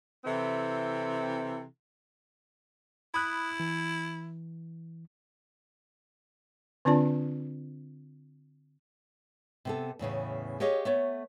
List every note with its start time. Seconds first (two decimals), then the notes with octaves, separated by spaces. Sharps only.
0.25 C3 E3 C4 E4 A4
3.14 E4 B5 D#6 F#6
3.60 E3
6.85 D3 C4 D4 F4 D5 A5
9.65 C3 B3 A4
9.99 E2 A2 C#3 E3
10.60 G4 G#4 C#5 D#5 F5
10.85 A3 B3 C#5